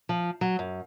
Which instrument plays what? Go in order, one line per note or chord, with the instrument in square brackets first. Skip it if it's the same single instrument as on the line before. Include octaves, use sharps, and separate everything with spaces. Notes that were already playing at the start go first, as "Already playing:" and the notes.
[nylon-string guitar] F3
F#3
F#2